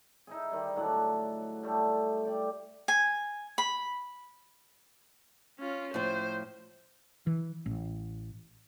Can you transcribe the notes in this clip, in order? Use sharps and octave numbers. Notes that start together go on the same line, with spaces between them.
D#4 E4 G#4
D#3 G3
A2 D3 F#3 F#5
G3 A3
G4 D5
G#5
B5
C#4 F4
A2 F3 C5
E3
A1